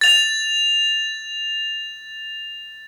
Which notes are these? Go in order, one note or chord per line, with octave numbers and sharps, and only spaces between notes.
A6 F7